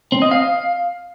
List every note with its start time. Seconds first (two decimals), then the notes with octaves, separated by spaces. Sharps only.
0.12 C4
0.22 D#5
0.31 F5